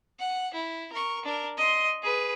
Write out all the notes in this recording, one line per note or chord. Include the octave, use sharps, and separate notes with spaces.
F#5
E4
A#4 C#6
D4 A#4
D#5 C6
G#4 B4